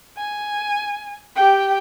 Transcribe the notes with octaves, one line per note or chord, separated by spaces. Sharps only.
G#5
G4 G5